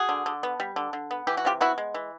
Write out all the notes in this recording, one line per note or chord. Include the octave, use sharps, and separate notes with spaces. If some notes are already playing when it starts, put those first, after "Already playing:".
Already playing: F#4 G#4
D3
D3
B3
G3
D3
D3
B3
E3 G4
F#4
C3 F4 G4
B3 E4 F#4
G#3
E3